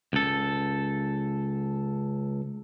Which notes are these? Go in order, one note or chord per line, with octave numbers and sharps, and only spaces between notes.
C#2 A4